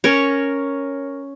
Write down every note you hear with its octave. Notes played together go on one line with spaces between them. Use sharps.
C#4 A#4 C#5